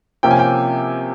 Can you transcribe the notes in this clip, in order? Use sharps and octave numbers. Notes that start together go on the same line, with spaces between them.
C3 F3 A#3 C#4 G5
G#5
G5